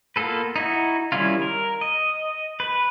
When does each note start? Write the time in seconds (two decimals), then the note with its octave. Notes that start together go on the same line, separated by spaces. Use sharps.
0.16 A#3 B3 F4 A4 B4
0.56 D#4 E4 F#4
1.12 D#3 G3 C#4 E4 F4
1.42 A#4
1.81 D#5
2.60 B4